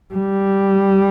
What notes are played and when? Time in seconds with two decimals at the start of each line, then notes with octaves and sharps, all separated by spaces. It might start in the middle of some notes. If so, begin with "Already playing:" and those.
0.14 G3